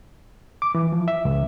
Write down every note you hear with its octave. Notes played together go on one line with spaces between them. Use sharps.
D6
E3
F3
E5
C#2